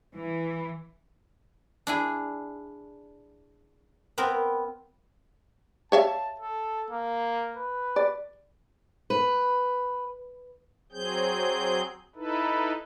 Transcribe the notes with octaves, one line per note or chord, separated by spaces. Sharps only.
E3
D4 E4 G#4
B3 C4 A#4
C#5 E5 F5 A5
A4
A#3
B4
D5
B4
F#3 C4 G#4 G6
D#4 E4 A4 B4